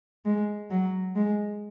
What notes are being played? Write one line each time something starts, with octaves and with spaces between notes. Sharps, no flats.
G#3
F#3
G#3